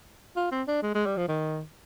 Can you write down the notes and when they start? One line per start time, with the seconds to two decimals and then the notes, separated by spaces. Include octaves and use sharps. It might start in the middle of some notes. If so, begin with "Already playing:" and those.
0.36 F4
0.52 C4
0.68 D4
0.83 G#3
0.95 G#3
1.06 G3
1.17 F3
1.29 D#3